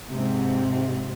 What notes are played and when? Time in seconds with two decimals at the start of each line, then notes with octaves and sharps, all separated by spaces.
0.11 G#2 C3 C4